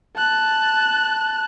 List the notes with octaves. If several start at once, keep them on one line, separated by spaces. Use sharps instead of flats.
A5 F#6